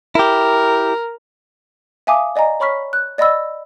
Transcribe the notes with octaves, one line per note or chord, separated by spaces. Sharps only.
E4 G4 A#4
E5 F5 G#5 A5 D6 D#6
D5 D#5 G#5 A#5
C#5 B5 C#6 F6 B6
F#6
D5 D#5 F#5 B5 E6